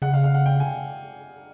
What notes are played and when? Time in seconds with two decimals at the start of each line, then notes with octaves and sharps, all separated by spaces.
0.02 C#3 F#5
0.13 F5
0.24 F5
0.35 F#5
0.46 G5
0.60 G#5